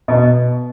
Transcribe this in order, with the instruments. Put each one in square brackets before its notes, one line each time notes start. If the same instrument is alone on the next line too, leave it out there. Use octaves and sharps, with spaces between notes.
[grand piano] B2